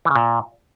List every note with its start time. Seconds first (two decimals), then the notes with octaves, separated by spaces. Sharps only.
0.05 E3
0.10 C#3
0.15 A#2